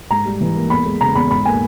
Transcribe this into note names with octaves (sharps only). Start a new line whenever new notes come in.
G#2 A#5
G3
E3
A#3
E2 B5
G#3
C#3 A#5
E2 B5
G#2 B5
A#3 G#5